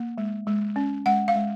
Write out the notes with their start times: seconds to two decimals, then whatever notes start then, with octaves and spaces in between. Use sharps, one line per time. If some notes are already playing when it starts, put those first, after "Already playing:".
Already playing: A#3
0.18 G#3
0.47 G#3
0.76 C#4
1.06 G#3 F#5
1.28 F5
1.36 G#3